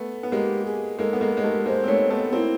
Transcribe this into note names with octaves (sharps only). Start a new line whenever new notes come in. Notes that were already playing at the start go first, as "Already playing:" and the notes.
Already playing: A3 B3
B3
G#3 A#3 G4
G#4
G#3 A#3 A4
B3
G#3 A#3
G#3 A#4
G3 A3
G#3 A#3 C5
C4
A3 B3 C#5
A3 B3 A4
A#3 C4 E4 G4